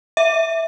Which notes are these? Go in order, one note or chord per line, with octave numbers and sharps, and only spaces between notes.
E5